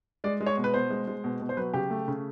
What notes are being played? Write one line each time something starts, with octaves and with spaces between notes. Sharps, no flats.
G#3 D5
G#3
C#5
B2
B4
B2 C5
G#3
G#3
B2
B2
C5
F#3 B4
C#3 G4
A3
C#3